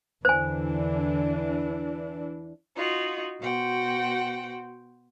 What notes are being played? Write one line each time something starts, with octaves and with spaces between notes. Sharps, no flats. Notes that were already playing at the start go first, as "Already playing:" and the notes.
E2 D3 E3 D4 C5 G#5
D#4 F4 F#4
B2 F#4 C5 F#5 G5